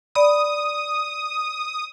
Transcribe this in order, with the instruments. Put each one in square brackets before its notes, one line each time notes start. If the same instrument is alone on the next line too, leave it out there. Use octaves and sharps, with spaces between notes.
[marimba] D5 B5 [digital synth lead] D#6